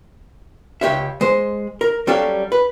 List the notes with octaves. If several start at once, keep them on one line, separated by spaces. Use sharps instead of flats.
C#2 G4 C#5 E5
G#3 C5
A#4
F#3 G3 C#4 G4 A4 F5
B4